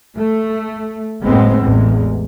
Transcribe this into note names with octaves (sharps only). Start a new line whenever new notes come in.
A3
F#1 A2 G#3 B3 C4
A1 E2 G#3